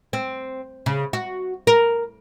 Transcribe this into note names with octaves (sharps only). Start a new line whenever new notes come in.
C4
C#3
F#4
A#4